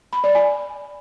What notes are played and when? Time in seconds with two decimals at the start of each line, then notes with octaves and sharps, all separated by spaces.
0.13 B5
0.24 D5
0.35 G#5